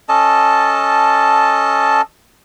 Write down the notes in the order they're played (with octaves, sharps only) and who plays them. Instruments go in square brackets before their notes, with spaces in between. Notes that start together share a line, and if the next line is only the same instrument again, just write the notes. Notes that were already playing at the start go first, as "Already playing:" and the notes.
[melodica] C#4 A4 D#5 A5